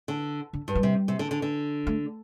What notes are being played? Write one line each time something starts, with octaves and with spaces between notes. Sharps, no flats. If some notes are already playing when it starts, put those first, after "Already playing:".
D3
D3
G2
G3
C3
C3
D3
D3
D3
A3